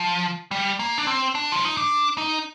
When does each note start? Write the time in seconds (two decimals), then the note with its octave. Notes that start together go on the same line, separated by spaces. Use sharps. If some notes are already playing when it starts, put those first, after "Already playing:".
Already playing: F3
0.51 G3
0.79 A#3
0.98 D4
1.07 C4
1.35 D4
1.52 F4
1.65 D#4
1.77 D4
2.18 D#4